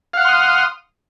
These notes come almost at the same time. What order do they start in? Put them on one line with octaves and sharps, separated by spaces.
F5 F#5 F6 C6 D#6